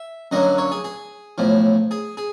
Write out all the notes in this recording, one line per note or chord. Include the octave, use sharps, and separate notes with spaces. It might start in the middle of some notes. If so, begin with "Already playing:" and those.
Already playing: E5
F#2 D3 F#3 A#3 D#5
C#5
G#4
G#4
B1 A2 F3
G#4
G#4